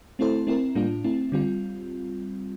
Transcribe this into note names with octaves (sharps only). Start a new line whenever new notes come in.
A3 C4 E4 A4 C5
A3 C4 E4 A#4
A2 G3 A#3 D4 F4
A3 C4 E4
D3 G3 C4 F4